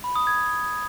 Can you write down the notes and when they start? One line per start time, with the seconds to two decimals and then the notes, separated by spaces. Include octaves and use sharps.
0.04 B5
0.16 D#6
0.27 G#6